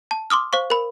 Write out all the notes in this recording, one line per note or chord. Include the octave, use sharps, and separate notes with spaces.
A5
C6 D6 D#6 F6
C5 F5 C#6
A#4 B5